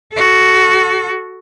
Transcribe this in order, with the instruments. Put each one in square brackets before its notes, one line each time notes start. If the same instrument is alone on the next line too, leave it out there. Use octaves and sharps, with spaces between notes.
[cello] F#4 A4